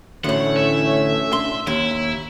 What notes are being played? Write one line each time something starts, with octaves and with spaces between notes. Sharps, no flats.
D2 A2 E3 A3 C#4 C#5 F#5
E5
D4 C6
D#2 E4 C#5